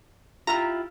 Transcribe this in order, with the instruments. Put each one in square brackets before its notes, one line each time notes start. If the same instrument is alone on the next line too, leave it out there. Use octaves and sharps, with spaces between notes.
[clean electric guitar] E4 F4 G4 [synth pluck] A#5